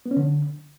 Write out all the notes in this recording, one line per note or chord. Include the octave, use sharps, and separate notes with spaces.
B3
C#4
D3